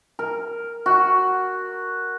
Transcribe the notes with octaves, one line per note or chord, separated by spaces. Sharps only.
A#4
F#4